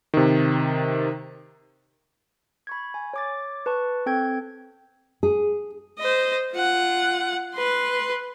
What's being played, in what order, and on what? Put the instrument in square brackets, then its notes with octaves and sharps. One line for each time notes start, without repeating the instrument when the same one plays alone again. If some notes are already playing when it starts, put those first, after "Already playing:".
[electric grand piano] C3 D#3
[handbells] B5 C#6 G#6
G#5
C#5 D6 A6
B4 A5 C#6
C4 A4 G5 G6 G#6
[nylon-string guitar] G#4
[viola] C5 D#5
F4 F#5
B4 C6